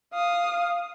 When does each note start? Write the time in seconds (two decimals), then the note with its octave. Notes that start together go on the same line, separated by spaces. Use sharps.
0.14 F5 D#6